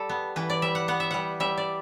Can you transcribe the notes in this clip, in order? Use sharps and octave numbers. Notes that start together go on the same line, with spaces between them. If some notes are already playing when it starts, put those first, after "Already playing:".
Already playing: G3 A4
B3
E3 B4
D5
G3 E5
F#5
B3 F#5
E5
G3 F#5
G3 E5
D5